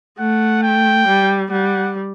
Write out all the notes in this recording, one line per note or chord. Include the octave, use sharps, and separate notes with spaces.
A3 F#5
G5
G3
G3 F#5